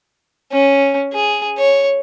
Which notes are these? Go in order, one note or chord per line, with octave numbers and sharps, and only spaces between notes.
C#4
G#4
C#5